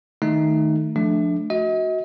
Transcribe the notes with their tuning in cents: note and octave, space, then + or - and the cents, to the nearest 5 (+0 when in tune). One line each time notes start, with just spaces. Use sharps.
D#3 +0 A3 +0 D#4 +0
F3 +0 A3 -15 D4 +5
F#4 +0 D#5 +40